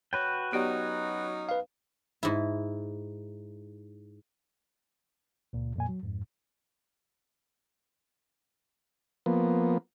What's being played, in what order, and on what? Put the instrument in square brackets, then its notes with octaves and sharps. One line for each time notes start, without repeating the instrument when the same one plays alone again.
[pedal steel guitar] F#4 B4 G5 [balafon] C#5
[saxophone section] F#3 C#4 D#4 [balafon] B3 G4 D5
[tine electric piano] B4 F5
[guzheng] G#2 E4
[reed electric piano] C#2 A#2
F2 A#2 G#5
F#3
F2 G#2
[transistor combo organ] F3 A#3 B3